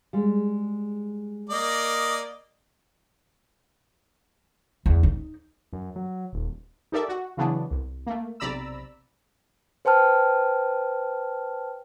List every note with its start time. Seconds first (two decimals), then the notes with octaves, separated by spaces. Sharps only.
0.13 G3 G#3
1.50 A#3 D5 D#5
4.86 E2
5.03 D#4
5.73 F#2
5.96 F#3
6.33 D#1
6.92 D#4 G4 A4 A#4 D5 E5
7.09 F#4
7.37 C#3 E3 F#3 B3 D4
7.71 C2
8.06 A3 A#3
8.40 B1 C3 D5 A#5 B5 E6
9.85 B4 C5 G5 A5 F6